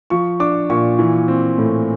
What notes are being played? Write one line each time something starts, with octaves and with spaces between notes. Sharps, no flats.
F3 C#6
D4 D6
A#2 C#6
E3
C4
A2